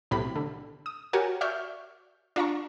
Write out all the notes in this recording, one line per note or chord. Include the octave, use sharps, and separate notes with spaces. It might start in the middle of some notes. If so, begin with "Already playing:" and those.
B1 A2 C3 B5
D3
D#6
F#4 G4 A#4 C#5 G#5
D5 E5 C#6 F6 G6
D4 F4 F5 A#5 C#6